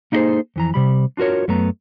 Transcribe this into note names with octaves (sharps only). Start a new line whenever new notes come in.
A#3 D#4 E4 G#4 A4 C5
F2 E3 A#5
C3 G3 B5
D4 F4 F#4 A#4 C#5
F#2 A3 B3 A#5